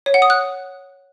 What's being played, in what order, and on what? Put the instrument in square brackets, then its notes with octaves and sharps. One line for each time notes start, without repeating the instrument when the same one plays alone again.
[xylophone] C#5
F#5
D#6
F#6